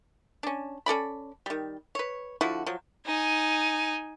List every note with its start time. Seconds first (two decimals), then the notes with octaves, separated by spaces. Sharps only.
0.43 C#4 D4
0.86 C#4 A4 D5 B5
1.46 D#3 G3
1.95 B4 C#5
2.41 D3 F3 E4 F#4
2.66 F3 F#3
3.06 D#4 G#5